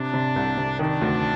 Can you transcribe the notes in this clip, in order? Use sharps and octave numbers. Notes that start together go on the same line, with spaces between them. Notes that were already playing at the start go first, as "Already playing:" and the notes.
Already playing: C3 D4
C3
C2
C3
D#3 D4
D2